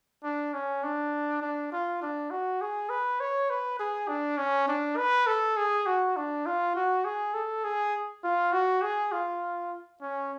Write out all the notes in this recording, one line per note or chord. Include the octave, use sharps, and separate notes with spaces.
D4
C#4
D4
D4
F4
D4
F#4
G#4
B4
C#5
B4
G#4
D4
C#4
D4
B4
A4
G#4
F#4
D4
F4
F#4
G#4
A4
G#4
F4
F#4
G#4
F4
C#4